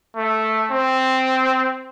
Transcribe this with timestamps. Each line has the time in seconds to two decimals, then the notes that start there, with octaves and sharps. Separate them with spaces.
0.16 A3
0.71 C4